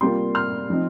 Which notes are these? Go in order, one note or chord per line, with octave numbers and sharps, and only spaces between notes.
C3 G3 A#3 F4 G5 C6
C6 F6
F3 C4 D#4